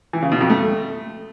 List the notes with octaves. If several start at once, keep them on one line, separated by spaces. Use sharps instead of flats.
E3
C#3
B2
F2
A3